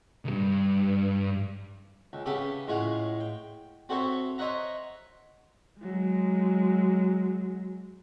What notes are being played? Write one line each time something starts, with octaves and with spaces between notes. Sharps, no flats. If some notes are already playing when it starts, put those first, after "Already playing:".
C#2 G2
C#2
C#3 B3 G4 A4 E5 D6
A2 G#3 F4 C#5 F#5
G5
C4 F#4 A4 C5 C#5 E5
C5 C#5 D#5 E5 F#5 A#5
F#3 G#3